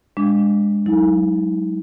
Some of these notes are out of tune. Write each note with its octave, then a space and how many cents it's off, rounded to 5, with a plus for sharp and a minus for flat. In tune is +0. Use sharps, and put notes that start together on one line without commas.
G#3 -25 D4 +0 D6 -35
F#3 +0 D#4 +45